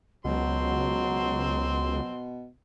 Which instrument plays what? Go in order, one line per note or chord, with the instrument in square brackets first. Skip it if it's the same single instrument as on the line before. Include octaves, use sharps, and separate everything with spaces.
[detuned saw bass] C#2 [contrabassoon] B2 [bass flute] F#3 [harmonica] C4 C6